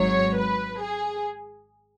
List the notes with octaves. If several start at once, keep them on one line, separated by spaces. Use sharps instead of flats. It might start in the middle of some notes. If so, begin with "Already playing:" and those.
Already playing: G#1 G#2 F#3 C#5
B4
G#4